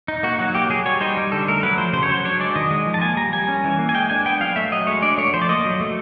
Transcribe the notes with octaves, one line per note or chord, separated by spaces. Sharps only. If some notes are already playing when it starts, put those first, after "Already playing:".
D#4
A#3 F#4
F#3 F#4
A#3 G4
F#3 G#4
G3 C#5
D#4 C5
G3
D3 A4
A3 A#4
F#3 B4
F3 C5
C#3 C5
C#5
F#3 C5
D4 C#5
G#3 D5
D#3 D#5
G#3
F3
A5
A#3 G#5
G3 A#5
G3 G#5
C#4
E3
A#3
G#5
G#3 G5
D4 G#5
B3 G5
F#3 F5
A3 E5
F#3 D#5
G#3 C#5
D4 D5
A3 C#5
F3 C5
D5
A#3 D#5
F#3
A3